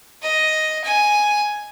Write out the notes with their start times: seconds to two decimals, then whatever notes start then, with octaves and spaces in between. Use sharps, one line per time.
0.22 D#5
0.84 G#5